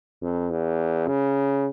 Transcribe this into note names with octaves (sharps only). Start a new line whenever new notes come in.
F2
E2
C#3